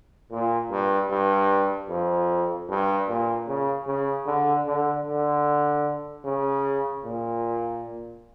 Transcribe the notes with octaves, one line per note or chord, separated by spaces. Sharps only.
A#2
G2
G2
F2
G2
A#2
C#3
C#3
D3
D3
D3
C#3
A#2